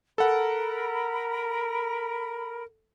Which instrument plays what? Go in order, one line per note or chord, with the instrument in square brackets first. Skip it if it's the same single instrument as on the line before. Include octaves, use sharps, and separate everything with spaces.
[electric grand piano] A4 F#5 [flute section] A#4 B5